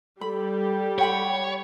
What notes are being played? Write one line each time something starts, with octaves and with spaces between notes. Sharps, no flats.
G3 G4 A4 B5
C#5 F#5 G5 B5